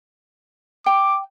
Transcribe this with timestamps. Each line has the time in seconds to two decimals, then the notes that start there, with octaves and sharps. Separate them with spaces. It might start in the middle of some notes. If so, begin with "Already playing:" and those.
0.86 G5 D6